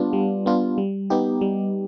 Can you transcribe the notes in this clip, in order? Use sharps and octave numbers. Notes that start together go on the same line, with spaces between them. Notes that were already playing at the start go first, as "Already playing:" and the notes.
Already playing: G3 B3 D4 F4
G3
B3 D4 F4
G3
B3 D#4 G4
G3